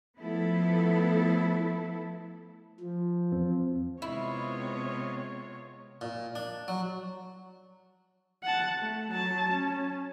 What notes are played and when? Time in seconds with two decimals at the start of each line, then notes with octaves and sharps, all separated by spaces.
0.19 F3 A3 B3 E4 A4
2.80 F3
3.32 E2 C4
4.02 C3 G#3 B3 E4 F4 C#5
6.01 A#2
6.35 D4
6.68 F#3
8.43 F#5 A5
8.79 A3
9.11 F#3 A5
9.51 C#4